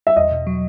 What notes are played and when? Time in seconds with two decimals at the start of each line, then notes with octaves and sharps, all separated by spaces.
0.07 E5
0.16 E2 D#5
0.32 B2
0.47 F#3